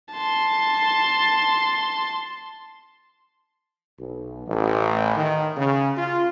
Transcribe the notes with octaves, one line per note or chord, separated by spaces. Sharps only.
A5 C6
B1
A1
D#3
C#3
F4